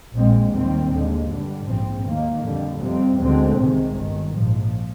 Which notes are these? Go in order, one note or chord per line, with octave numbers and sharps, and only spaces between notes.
A#1 A#2 G#3 C4
D#2 D#3 G3 C4
D#2 D3 G#3
G2 D3 G3
A#1 G#2 F3 C4
D#2 D#3 A#3
F2 D3 G3
F2 C3 G3 C4
D2 D3 G#3 C4
C2 C3 D#3 G#3
G1 G2 D#3
A#1 G#2 F3